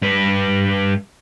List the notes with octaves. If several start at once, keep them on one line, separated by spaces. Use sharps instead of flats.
G2 B4